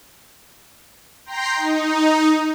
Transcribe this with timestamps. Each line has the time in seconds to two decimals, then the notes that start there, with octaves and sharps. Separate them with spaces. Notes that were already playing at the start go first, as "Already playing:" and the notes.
1.25 G5 A#5 C6 G6 A#6 C7
1.56 D#4